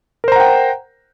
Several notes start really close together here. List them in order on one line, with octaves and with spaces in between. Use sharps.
A#4 C5 A#5 F#5 G5